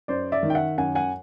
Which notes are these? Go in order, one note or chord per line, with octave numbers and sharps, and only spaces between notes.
F#2 C5 D5
D5 E5
D#3
G5
E5 F#5
F#2 F#5 G#5
F#5 G#5